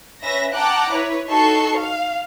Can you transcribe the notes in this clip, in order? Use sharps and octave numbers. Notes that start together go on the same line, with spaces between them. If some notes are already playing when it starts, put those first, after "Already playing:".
C#4 B4 E5 A#6
F#5 G5 A5 A#5 D6 F#6
E4 B4 C#5
D#4 F#4 A4 C#6 C7
F5